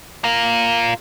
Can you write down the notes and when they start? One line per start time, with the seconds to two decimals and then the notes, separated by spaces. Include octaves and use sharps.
0.24 F4 A#4